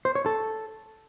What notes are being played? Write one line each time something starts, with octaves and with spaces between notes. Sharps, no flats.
C5
C#5
A4